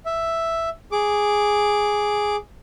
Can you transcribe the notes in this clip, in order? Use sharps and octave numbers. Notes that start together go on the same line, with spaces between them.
E5
G#4 D6